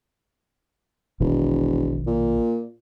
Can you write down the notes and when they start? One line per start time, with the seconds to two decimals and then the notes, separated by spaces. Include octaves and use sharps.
1.20 E1 A#1 B2 D#3
2.07 A#2